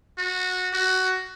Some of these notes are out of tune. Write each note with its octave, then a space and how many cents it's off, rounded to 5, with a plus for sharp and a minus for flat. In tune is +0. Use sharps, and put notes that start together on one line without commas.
F#4 -15
F#4 +15